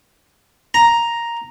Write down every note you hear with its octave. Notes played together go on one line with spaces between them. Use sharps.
A#5